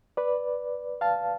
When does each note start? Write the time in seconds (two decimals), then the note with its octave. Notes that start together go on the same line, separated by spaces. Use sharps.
0.17 B4 D5
1.01 F5 A5